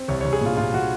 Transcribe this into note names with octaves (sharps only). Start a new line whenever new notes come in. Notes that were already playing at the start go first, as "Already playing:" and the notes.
Already playing: C4
C2 C#5
C#5
C2
G#4
A#2 F4
A#2 F4
A#2 F#4